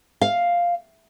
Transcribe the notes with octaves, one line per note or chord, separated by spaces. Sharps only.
F5